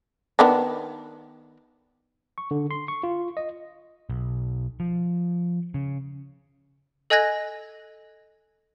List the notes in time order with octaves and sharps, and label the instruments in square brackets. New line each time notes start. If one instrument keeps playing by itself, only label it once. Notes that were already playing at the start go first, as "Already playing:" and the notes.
[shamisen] D#3 B3 D4
[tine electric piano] C#6
D3
C6
C#6
F4
D#5
[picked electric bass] B1
F3
C#3
[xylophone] A4 D#5 G#5 F#6 G#6 A#6